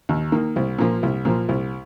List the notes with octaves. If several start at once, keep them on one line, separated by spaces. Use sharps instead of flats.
D#2
D#3 A#3
C2
A#2 F3 A#3
C2
A#2 F3 A#3
C2